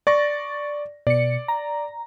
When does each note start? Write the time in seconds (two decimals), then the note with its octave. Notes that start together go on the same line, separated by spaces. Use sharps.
0.07 D5 C#6 A6 A#6
1.07 B2 D5 C#7
1.48 A#5